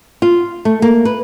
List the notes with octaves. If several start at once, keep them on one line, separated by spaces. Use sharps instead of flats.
F4
A3
A#3
B4